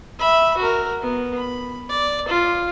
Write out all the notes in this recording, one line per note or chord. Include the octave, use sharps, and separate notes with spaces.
E5 B5
F#4 A#4
B3
B5
D5
F4